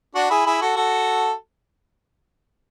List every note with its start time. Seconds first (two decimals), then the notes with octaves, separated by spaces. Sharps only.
0.15 D4 F#4
0.30 E4 G#4
0.46 E4 G#4
0.61 F#4 A4
0.76 F#4 A4